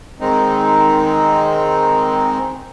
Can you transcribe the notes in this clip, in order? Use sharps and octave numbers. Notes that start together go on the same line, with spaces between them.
D#3 G#3 C4 D#4